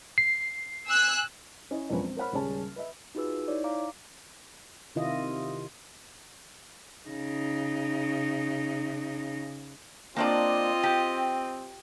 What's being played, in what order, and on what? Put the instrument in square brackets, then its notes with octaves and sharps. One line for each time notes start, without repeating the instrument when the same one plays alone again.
[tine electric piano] C7
[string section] G#5 E6 F#6
[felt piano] C#4 E4 D#5
E1 A#1 F3 F#3 C#4 B4
C4
A#4 C5 C#5 F#5 B5 F6
D#1 C#3 G3 G#3 C#4 A5
B4 D#5 E5
[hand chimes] D#4 F4 F#4 G#4 B4 E6
D#4 E4 C#5 D5
F5 A#5 D6
[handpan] C3 D#3 E4 F4 D#5
[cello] C#3 D#4
[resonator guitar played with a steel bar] A#3 D4 D5 [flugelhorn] C4 [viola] F4 D#5
[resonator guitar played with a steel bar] G4